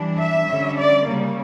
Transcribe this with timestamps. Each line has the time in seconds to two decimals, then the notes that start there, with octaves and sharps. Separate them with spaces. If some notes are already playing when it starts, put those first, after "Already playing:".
Already playing: E3 G3 D4
0.18 E5
0.48 D3 G3 C#4
0.77 D5
1.06 C#3 G3 A#3 C#4